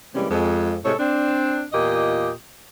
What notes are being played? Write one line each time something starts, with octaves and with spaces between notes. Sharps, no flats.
C3 E3 G3 G#3 A#3 C#4
F2 G#3
A2 C3 G#3 A4 C#5
C4 D4
E2 A#2 F4 G4 D#5